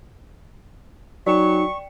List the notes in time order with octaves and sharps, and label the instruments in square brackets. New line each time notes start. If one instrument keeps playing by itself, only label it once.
[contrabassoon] F#3 [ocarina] D#4 [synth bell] D5 G5 C#7 [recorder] C#6